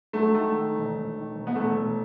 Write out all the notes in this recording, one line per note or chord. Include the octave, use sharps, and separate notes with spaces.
F#3 A3
D#3 A3
D#3
E1
E1
D#3
E1
B3
E1 A3
E1